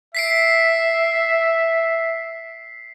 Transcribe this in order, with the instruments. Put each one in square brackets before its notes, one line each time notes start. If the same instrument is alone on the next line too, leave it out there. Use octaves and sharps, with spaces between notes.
[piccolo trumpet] E5 [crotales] B6 C7 D7